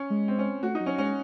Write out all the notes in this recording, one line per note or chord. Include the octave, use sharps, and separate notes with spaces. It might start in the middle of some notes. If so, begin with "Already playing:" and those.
Already playing: C#4
G#3
C4
C#4
A3 F#4
D#4
F#3
C#4
G#3 C#4